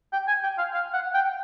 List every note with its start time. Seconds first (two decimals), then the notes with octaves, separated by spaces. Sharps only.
0.13 G5
0.28 G#5
0.43 G5
0.58 F5
0.74 F5
0.94 F#5
1.14 G5